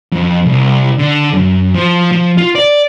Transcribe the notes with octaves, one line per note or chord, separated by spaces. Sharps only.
F2
C2
D3
F#2
F3
F3
F4
D5